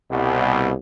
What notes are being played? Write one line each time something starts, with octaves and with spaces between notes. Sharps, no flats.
C2 B2